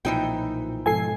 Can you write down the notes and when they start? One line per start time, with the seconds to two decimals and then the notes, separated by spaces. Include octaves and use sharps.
0.05 B1 A#2 E3 F3 D#4 G5
0.86 G#2 B2 F3 A4 G#5 C7